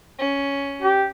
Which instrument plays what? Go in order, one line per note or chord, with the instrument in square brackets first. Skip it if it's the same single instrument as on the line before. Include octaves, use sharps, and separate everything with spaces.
[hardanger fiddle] C#4
[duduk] G4